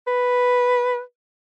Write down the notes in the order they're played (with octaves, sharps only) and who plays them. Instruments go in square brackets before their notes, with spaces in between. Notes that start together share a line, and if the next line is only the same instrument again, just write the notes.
[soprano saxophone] B4